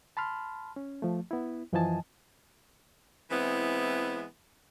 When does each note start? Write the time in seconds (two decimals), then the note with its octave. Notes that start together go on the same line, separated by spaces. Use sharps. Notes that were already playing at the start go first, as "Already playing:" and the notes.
0.17 A5 B5 C6 F6
0.76 C#4
1.02 F3 A3
1.31 B3 E4
1.73 F#2 E3 F3 D#5 G#5 A5
3.30 E3 G#3 B3 C4 E4